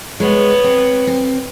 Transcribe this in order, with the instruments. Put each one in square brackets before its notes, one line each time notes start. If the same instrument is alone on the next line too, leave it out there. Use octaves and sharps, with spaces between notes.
[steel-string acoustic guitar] G#3 [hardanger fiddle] B3 C#5
[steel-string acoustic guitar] C4
C4